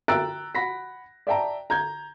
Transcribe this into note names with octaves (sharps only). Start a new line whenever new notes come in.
G5 A#5 E6 F#6 A6 D7
F#5 B5 A#6 B6
D5 E5 G5 A5 A#5
A#5 G6 G#6